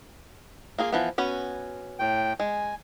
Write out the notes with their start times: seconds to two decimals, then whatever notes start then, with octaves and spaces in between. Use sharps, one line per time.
0.78 A#3 F4 G#4
0.92 E3 F3 B3
1.18 B3 C#4 F#4
1.99 A2 G5
2.40 G#3 G#5